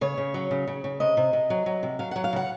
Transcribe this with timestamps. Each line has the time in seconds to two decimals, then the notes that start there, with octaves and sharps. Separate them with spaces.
0.01 C#3 C#5
0.17 C#3
0.34 F#3
0.51 C#3
0.68 C#3
0.84 C#3
1.00 C3 D#5
1.17 C3
1.33 C3
1.50 F#3
1.66 F#3
1.83 C3
1.99 F#3 F5
2.11 F#3 F#5
2.24 F5
2.33 C#3 F#5